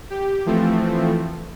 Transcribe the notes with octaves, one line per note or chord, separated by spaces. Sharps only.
G4
E3 F3 A3 C4